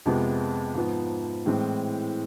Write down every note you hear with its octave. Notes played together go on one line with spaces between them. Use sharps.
F2 C3 G#3 B3
G#2 F3 B3
A2 E3 G#3 C4